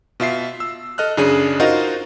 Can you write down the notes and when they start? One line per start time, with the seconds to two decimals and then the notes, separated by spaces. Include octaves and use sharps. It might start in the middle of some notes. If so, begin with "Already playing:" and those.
0.20 B2 F4 E5 C7
0.60 E6
0.98 A4 D#5 F6 F#6
1.17 F#2 C#3 D4 G#4 D#7
1.60 D#4 F4 F#4 A#4 C5 D#5